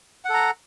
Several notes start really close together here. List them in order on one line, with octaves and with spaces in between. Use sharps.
F#5 A4 A#5